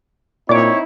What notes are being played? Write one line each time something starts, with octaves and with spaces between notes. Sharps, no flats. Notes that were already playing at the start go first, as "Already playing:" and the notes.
A#2 C4 D#4 E4 C#5 D5 D6